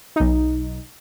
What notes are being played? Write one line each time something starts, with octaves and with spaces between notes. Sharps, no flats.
B1 D#4